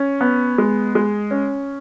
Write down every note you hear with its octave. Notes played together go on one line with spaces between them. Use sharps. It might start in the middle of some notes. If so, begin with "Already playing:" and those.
Already playing: C#4
B3
G#3
G#3
C#4